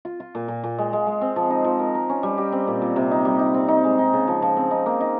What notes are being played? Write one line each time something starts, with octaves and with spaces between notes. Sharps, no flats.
F4
F4
A#2
A#2
A#2
G#3
G#3
G#3
C4
F3
D#4
F3
A#4
A#4
C#4
G3
G4
C4
A#2
A#2
C3
D#4
G3
D#4
C4
D#4
G#3
D#4
C#3
F3
F3
C4
D#4
A#3
D#4